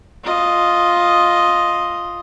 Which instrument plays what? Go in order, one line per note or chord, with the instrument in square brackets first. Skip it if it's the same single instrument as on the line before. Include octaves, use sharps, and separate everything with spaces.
[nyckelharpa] F4 D#5